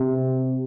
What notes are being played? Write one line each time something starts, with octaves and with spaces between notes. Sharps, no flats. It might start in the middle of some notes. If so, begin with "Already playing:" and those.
Already playing: C3